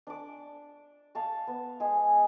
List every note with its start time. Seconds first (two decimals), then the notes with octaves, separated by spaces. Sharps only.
0.07 D4 D6
1.15 F5 A5 C#6
1.47 B3
1.80 G#3 G#4